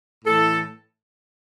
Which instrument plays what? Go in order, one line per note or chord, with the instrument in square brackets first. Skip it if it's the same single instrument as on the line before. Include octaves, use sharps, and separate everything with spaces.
[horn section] A2 E3 A4